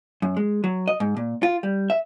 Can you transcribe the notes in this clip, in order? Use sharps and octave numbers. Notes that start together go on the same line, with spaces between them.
F#2
G#3
F#3
D#5
G#2
A#2
F4
G3
E5